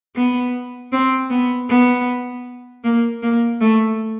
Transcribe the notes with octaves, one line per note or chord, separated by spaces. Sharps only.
B3
C4
B3
B3
A#3
A#3
A3